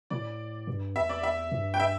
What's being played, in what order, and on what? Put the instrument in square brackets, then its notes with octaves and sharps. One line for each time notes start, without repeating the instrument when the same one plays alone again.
[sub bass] A2 [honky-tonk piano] D5
[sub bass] G2
[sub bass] E2 [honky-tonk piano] E5
[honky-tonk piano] D5
E5
[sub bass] G2
[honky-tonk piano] G5
E5